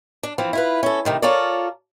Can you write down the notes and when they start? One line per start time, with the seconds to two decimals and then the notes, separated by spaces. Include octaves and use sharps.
0.23 D4
0.38 E3 F3 C4
0.53 E4 F4 B4
0.83 C#4 A4
1.05 C3 D#3 A3
1.22 F4 A4 A#4 C#5 D5